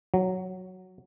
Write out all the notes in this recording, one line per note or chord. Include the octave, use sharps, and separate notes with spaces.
F#3